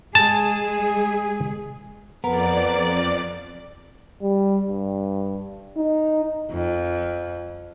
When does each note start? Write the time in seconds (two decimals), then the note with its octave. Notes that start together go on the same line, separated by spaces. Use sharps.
0.15 G#3 G#4 G#5 A5
2.24 F2 B3 A#4 D5
4.22 G3
4.68 G2
5.77 D#4
6.51 F2